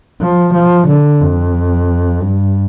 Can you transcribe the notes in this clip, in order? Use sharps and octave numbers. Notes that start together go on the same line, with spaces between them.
F3
F3
D3
F2
G2